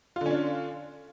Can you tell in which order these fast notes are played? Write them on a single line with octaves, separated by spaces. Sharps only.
F4 D3 C#4 D4